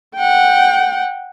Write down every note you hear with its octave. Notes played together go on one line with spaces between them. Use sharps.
F#5 G5